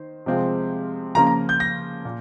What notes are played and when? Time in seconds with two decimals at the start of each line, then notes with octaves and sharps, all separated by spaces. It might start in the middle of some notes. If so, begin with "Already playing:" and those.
Already playing: D#3 C5
0.26 C3 F3 G#3 C4 F4
1.15 C#3 F3 A#3 C#4 F4 A#5
1.27 A#5
1.49 G6
1.60 A#6
2.05 A#2